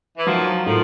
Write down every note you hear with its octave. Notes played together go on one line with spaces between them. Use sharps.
E3
D#3 F3 F#3
A2 D#3 F3